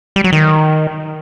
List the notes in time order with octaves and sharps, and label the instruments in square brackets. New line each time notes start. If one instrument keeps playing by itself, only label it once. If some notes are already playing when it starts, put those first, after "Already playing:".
[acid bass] G3
F#3
D#3